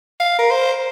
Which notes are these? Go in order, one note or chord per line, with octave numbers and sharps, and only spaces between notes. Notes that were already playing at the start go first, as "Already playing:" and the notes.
F5
A#4
C5